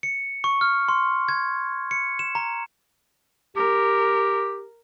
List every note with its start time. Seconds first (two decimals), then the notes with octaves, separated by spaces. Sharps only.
0.03 C#7
0.44 C#6
0.61 F6
0.88 C6
1.29 G#6
1.91 C#7
2.19 E7
2.35 A#5
3.56 G4 A#4